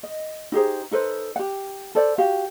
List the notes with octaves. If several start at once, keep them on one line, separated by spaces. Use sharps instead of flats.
D#5
D#4 G4 G#4 C5
D#4 A4 B4 C5
G4 F#5
A4 C5 D5
F#4 G4 F5